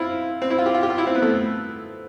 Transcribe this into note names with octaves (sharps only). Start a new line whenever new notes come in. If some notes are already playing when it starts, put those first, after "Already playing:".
Already playing: C4 E4 F4
C4
E4
F4
G4
F4
G4
F4
E4
C4
B3
A3